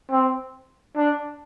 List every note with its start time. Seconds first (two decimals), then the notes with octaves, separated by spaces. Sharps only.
0.11 C4
0.97 D4